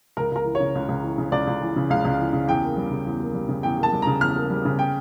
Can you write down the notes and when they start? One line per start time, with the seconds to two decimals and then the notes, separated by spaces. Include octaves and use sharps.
0.17 C#2 A#4
0.32 C#2 A#4
0.45 E3
0.55 C#5
0.60 C#3
0.75 C#2
0.89 C#2
1.04 E3
1.18 C#3
1.32 C#2 D5
1.47 C#2
1.62 E3
1.76 C#3
1.90 C#2 F5
2.05 C#2
2.19 E3
2.33 C#3
2.48 E2 G5
2.62 A#3
2.77 G3
2.91 C#3
3.06 E2
3.20 A#3
3.34 G3
3.49 C#3
3.63 E2 G5
3.78 A#3
3.83 A5
3.93 G3
4.02 C#3 A#5
4.21 E2 F6
4.35 A#3
4.50 G3
4.65 C#3
4.79 G5